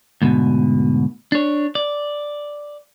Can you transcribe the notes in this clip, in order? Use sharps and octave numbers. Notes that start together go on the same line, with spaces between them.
D2 G#2 B2
D4 C#5
D5